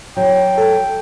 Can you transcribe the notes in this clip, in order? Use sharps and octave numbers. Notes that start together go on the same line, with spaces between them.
F#3 G5
A4